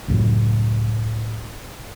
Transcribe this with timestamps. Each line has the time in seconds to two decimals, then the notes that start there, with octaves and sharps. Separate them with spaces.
0.08 C#2 F#2 A2